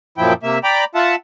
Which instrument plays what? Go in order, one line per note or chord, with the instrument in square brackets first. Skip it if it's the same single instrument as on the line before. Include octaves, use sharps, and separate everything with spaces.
[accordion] F#2 A#2 F3 E4 G5
C3 A#3 E5
D5 G5 A#5 B5
F4 E5 F#5 A5